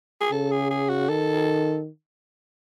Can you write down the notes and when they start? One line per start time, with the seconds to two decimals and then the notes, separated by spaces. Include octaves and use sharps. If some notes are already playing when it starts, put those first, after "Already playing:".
0.20 G#4
0.31 C#3 A4
0.51 G#4
0.70 G#4
0.89 F#4
1.09 D#3 A4